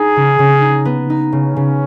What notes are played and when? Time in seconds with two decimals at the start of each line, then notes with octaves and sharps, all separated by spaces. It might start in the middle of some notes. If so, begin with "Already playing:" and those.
Already playing: D#4 G#4
0.16 C#3
0.39 C#3
0.62 D#4
0.85 B3
1.10 D#4
1.32 C#3 C#4
1.56 C#3